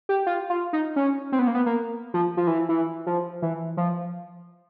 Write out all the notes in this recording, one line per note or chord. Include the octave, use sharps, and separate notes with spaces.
G4
F4
F4
D#4
C#4
C4
B3
A#3
B3
A#3
F3
F3
E3
E3
F3
E3
F3